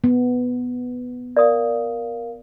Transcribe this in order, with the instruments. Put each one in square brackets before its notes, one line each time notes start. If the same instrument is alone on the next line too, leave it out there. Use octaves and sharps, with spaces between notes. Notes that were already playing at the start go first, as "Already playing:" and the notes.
[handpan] B3
[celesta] A#4 F5 [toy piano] D5 D#6